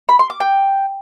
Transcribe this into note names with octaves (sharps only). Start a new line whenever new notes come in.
B5
C6
D6
G5